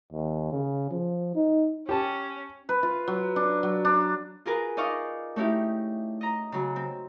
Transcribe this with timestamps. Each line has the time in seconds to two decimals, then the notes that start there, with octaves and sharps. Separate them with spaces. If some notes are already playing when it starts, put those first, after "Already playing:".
0.13 D#2
0.52 C#3
0.91 F3
1.35 D#4
1.89 C#4 G4 A5
2.69 B4
2.83 F4
3.07 F#3
3.36 D4
3.63 F#3
3.85 D4
4.45 F4 G#4 A#4 B4
4.77 D#4 D5 D#5 F5 C#6 D6
5.36 A3 C#4 D#4 E4 G4
6.21 D#5 A#5
6.52 C#3 F#3
6.76 C4